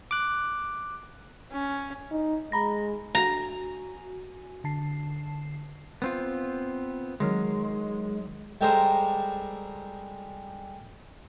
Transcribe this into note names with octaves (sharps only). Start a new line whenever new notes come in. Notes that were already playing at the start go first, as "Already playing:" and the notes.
D6 F#6
C#4
D#4
G#3 A#5 B5 A#6
F#4 G#5 A#5
D3 A5 C7
B3 C4 F4
D#3 F#3 G#3 F6
G3 G#3 G4 A4 A#4 C5